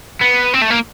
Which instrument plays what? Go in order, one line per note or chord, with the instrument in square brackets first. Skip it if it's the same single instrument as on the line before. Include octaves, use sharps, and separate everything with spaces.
[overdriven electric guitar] B3
C4
A3
A#3